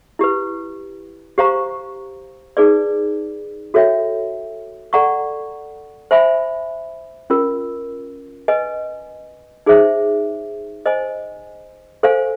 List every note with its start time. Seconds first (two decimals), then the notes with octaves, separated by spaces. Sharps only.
0.19 E4 G4 B4
1.38 G4 C5 F5 A#5 C#6
2.57 D#4 G#4 B4 D5
3.74 F#4 A4 C#5 E5 G5
4.93 A4 D5 F#5 A#5 C#6
6.11 C5 E5 G#5 B5
7.30 C#4 F4 A#4
8.48 B4 D#5 G#5
9.66 D#4 G#4 C5 E5
10.86 C5 D#5 G#5
12.03 A4 C5 F5 G#5